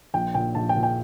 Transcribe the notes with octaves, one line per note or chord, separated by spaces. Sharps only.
A#1 G5
A#2 G5
A#1 A5
G5
A#2
G5